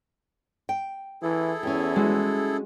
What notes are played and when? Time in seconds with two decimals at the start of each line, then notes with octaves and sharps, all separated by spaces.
0.69 G5
1.22 E3 E4 G#4 A4
1.63 E2 C#4 G4
1.96 G#3 F#4